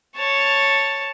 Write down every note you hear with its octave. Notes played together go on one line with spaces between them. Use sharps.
C#5 A5